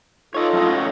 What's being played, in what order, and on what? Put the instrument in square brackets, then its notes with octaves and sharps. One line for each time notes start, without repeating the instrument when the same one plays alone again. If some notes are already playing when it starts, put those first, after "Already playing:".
[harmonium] D#4 F4 A4 [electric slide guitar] C#5 D#5
[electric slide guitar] F#2 A2 D#5
[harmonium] C#5